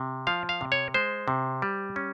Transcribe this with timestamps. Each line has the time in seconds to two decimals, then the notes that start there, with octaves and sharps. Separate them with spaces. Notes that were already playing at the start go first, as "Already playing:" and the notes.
Already playing: C3
0.27 F3 F5
0.49 F5
0.61 C3
0.72 C#5
0.94 G#3 C5
1.28 C3
1.62 G3
1.96 C#4